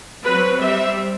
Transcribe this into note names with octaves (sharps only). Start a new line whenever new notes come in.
F#3 C4 B4
G3 C4 E5